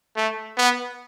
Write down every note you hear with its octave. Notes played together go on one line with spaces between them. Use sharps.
A3
B3